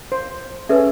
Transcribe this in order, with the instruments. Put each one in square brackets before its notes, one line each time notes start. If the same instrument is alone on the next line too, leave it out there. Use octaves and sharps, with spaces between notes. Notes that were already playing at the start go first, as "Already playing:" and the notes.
[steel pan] C5
[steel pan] C#4 G#4 A4 [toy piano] B4 E5